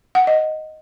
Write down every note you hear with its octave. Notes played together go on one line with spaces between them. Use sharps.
F#5
D#5